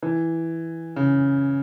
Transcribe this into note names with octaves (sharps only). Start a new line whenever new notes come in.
E3
C#3